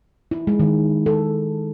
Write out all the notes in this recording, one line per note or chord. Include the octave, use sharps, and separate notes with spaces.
E4
G#3
D#3
A4